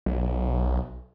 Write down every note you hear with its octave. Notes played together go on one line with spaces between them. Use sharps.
B1